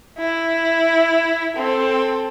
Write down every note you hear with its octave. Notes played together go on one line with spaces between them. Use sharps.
E4
C4 A4